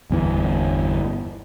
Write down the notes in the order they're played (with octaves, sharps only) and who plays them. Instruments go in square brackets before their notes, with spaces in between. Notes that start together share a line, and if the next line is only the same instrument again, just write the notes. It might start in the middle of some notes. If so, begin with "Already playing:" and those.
[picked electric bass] G1 E2 E3